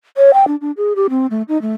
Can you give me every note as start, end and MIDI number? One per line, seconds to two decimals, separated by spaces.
0.17 0.31 73
0.34 0.47 79
0.48 0.56 62
0.61 0.71 62
0.77 0.93 68
0.96 1.07 67
1.10 1.27 60
1.31 1.43 57
1.48 1.60 63
1.62 1.73 57